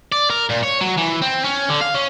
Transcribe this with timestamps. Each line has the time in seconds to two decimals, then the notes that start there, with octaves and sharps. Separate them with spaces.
0.12 D5
0.30 A#4
0.49 A#2
0.63 C#5
0.81 F#3
0.98 E3
1.22 C4
1.44 C#4
1.69 D3
1.81 F5
1.95 C#4